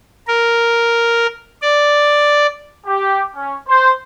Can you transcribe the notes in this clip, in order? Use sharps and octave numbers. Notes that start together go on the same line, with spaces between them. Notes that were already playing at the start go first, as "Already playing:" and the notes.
A#4
D5
G4
C#4
C5